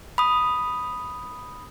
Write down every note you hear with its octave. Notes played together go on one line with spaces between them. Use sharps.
B5 D#6